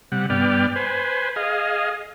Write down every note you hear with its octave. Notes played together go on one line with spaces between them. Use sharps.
C3 G3 F#5
G2 B3 D5 G5 F6
B4 C5 G#5
G#4 D#5 F5